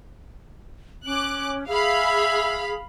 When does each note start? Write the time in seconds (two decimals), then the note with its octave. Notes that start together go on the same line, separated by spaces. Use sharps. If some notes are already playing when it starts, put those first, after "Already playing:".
1.06 C#4 D6 F#6
1.68 G#4 E5 F5 B5